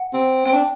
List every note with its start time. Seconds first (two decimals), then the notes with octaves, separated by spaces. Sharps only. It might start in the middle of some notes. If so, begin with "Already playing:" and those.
Already playing: F#5
0.14 C4
0.46 C4 G5
0.54 D4